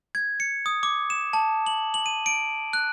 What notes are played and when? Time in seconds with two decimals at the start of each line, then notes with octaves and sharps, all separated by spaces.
0.15 G#6
0.40 C#7
0.66 D#6
0.83 D6
1.10 E7
1.33 A5
1.66 F#7
1.94 F#7
2.06 D#7
2.26 D7
2.73 F#6